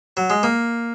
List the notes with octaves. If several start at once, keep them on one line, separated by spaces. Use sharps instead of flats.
F#3
G#3
A#3